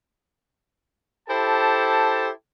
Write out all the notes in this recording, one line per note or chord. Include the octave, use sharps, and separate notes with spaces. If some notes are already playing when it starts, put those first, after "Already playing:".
E4 G4 A4 C5 A5